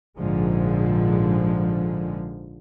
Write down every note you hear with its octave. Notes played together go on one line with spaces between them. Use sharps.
A#1 G#2 D3 F3 G#3